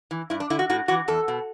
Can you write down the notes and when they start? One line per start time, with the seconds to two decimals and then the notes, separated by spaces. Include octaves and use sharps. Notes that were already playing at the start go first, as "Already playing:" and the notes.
0.11 E3
0.30 G2 E4
0.40 D4
0.50 D3 E4
0.59 F#4
0.70 A2 F#4
0.88 E3 F#4
1.08 E2 A4
1.28 B2